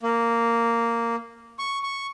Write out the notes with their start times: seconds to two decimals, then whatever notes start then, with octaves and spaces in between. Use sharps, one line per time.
0.03 A#3
1.59 C#6
1.83 C#6